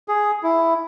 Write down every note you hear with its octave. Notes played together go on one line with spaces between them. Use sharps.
G#4
E4